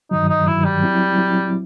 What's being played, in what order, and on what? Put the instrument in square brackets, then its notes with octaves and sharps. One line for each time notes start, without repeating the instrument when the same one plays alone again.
[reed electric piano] G2 D#3 F#3 [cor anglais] D#4
[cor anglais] D#4
[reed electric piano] G2 D#3 F#3 [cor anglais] E4
[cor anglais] G3
[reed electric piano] F#3 C4 E4
F#3 C4 E4